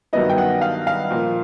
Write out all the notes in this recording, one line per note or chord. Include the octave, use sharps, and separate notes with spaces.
G2 D#3 F#3 B3 E4 D#5
G5
F#5
F5
F5
A#2 F3 A#3